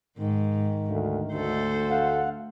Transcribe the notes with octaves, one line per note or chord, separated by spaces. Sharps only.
G#2 D#3
D2
D2 A3 A4 C5
F5 F#5